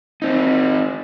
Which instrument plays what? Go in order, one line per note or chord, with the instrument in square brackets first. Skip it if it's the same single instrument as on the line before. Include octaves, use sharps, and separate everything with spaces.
[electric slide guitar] C4 D#4